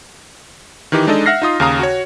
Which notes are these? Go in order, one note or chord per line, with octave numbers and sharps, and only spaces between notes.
D#3 E3 D#4 G4
G#3 D4 D#4 A4 D#5
E5 F#5 F6 A#6 C7
D#4 F4 D#6
D#2 C#3 F5 A#5 D#6
F#4 C#5